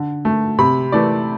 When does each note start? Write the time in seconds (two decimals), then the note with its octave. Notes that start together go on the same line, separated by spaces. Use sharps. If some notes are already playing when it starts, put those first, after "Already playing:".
Already playing: D3
0.25 A3
0.58 C3 B5
0.92 E3 A3 D5